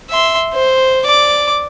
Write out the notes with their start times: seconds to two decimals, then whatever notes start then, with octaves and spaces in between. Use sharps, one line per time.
0.10 E5 C6
0.54 C5
1.05 D5 D6